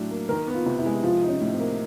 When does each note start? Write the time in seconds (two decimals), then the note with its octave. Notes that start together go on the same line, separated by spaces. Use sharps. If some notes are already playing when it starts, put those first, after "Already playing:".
Already playing: A2 F#3 D4
0.11 A#3
0.29 D#3 A#4
0.48 B3
0.54 F4
0.66 C3
0.79 E4
0.86 G#3
1.03 F3 F4
1.22 D#4
1.29 C#4
1.40 A2
1.53 C4
1.59 A#3